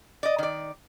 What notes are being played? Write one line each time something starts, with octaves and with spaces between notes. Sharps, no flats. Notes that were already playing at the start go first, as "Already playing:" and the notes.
D5 D#5
D#3 D5